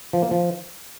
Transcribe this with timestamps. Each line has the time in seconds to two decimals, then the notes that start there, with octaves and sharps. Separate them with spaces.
0.13 F3
0.22 A#3
0.31 F3